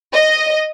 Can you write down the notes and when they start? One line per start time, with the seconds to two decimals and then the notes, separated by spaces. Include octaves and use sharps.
0.13 D#5